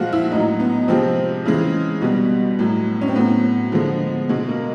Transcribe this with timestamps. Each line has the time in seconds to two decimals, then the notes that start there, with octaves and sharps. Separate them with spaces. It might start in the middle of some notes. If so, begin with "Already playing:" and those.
Already playing: A#2 F3 G#3 F4 F#4
0.13 E4
0.26 E4
0.31 A2 F#3 D#4
0.60 B3
0.88 C3 F3 G#3 C4
1.45 C#3 E3 G#3
2.02 B2 G3 B3
2.59 A2 F#3
3.01 C#4
3.08 C4
3.15 A2 F#3 B3
3.72 D3 F3 G#3
4.29 B2 G#3
4.48 A#3